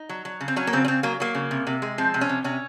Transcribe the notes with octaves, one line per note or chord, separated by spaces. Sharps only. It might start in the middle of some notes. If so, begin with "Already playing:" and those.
Already playing: D#4
F#3
F#3
C#3
C4
F#3 C#4
A#3
C#3 C4
C#4
C#3 C4
F#3 A#3
F#3 A#3
C#3
C3
C3
G#3
F3 C4
C3
C#4
C3
C3 C#4